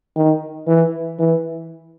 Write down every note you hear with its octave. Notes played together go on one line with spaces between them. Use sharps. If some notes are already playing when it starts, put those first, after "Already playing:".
D#3
E3
E3